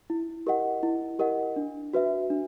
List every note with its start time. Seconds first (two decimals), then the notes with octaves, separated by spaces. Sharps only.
0.10 E4
0.47 G4 A#4 D#5 F#5
0.83 E4
1.19 G4 A#4 D#5 F#5
1.56 D4
1.93 F#4 B4 E5
2.30 D4